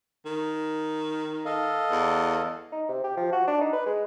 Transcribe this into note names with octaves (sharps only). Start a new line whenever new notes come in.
D#3
A4 D#5 F5
E2
D#4
C3
G4
F3
F#4
D4
D#4
B4
G#3